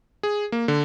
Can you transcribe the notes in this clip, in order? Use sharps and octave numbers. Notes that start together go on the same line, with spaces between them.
G#4
A#3
D3